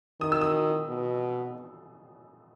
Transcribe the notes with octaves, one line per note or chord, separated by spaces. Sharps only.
D#3 D#6
E6
D#6
B2